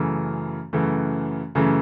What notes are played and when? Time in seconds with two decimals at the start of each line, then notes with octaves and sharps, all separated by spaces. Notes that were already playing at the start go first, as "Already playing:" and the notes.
Already playing: F#2 C#3 E3 A3
0.73 F#2 C#3 E3 A3
1.55 F#2 C#3 E3 A3